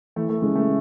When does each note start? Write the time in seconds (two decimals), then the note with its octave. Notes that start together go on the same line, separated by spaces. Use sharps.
0.16 E3 A3
0.29 A3
0.42 C#3 G#3
0.55 A3